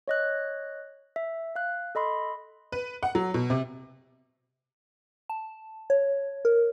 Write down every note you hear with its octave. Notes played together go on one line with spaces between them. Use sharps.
C#5 D#5 F#6
E5
F5 F#6
A4 D#5 B5 C6
B4
F#5
F#3
B2
C3
A5
C#5
A#4